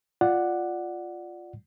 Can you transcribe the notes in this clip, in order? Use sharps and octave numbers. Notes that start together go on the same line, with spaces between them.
F4 D5 F#5